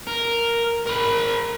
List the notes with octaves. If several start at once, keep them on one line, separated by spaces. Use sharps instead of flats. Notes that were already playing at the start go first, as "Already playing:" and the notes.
A#4
A#4 B5